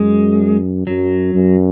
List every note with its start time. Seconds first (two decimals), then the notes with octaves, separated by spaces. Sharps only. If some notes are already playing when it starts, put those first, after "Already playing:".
Already playing: F#2 G#3
0.87 F#2 F#3
1.35 F#2